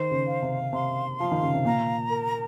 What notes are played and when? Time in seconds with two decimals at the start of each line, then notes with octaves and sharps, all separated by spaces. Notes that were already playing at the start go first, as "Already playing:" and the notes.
Already playing: D#3 C5
0.11 C#3
0.27 F5
0.42 C3
0.73 C3 C6
1.19 F3 F5
1.32 D#3
1.43 C#3
1.54 C3
1.65 A#2 A#5
2.11 A#4